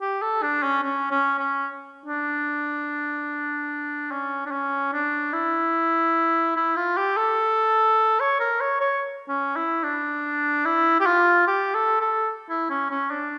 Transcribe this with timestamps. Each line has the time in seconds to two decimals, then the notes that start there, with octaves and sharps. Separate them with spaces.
0.01 G4
0.22 A4
0.43 D4
0.63 C#4
0.83 C#4
1.11 C#4
1.38 C#4
2.06 D4
4.11 C#4
4.46 D4
4.51 C#4
4.93 D4
5.33 E4
6.56 E4
6.76 F4
6.97 G4
7.17 A4
8.20 C#5
8.40 A#4
8.61 C#5
8.81 C#5
9.28 C#4
9.56 E4
9.83 D4
10.65 E4
11.00 G4
11.06 F4
11.47 G4
11.75 A4
12.01 A4
12.49 E4
12.70 C#4
12.90 C#4
13.11 D4